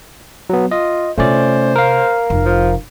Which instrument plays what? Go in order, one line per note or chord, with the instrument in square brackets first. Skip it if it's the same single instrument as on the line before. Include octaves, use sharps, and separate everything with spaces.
[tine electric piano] F#3 B3
[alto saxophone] F4 [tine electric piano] D#5
[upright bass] C3 F4 [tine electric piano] A3 C#4 D5 [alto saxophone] C5
[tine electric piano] A#4 F5
[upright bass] F1
[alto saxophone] F3